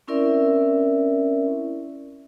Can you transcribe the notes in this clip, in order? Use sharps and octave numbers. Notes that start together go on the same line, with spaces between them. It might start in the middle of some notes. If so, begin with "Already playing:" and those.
C4 C#4 E4 A#4 D5 E5